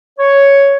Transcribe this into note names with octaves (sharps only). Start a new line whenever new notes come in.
C#5